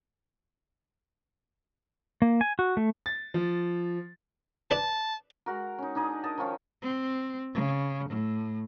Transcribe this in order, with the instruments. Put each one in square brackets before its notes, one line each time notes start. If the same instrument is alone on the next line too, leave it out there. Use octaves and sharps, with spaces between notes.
[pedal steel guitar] A#3
G#5
F#4
A3
[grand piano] A6
F3
[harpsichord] D4 B4 [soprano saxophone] A5
[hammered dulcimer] G#3 F#4 A#4
C#4 D#4
D4 D#4 G#4 D#5
A#4 D#5 A5
D#3 F3 C#4 F4
[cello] C4
C#3
A2